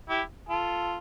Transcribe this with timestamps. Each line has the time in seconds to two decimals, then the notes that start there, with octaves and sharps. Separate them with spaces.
0.10 E4 G4
0.49 F4 A4